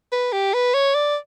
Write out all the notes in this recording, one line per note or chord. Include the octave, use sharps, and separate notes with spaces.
B4
G4
B4
C#5
D5